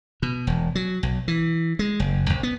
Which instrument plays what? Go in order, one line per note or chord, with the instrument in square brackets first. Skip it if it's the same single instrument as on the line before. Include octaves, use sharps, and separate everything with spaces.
[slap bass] B2
E1
F#3
B1
E3
G#3
F#1
C2
B3